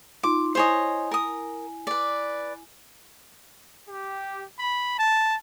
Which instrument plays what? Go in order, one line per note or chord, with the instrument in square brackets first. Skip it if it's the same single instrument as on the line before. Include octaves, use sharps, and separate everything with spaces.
[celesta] D#4 F4 C6 [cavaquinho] D6
[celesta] E4 G#5 [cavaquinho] C5 C#5 D#5
[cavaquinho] A#4 D#6
B4 D5
[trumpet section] G4
B5
A5